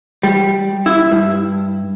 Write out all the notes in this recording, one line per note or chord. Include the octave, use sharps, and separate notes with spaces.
G3
E4
G2